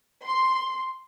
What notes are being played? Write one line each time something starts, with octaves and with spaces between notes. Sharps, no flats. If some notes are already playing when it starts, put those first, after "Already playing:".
C6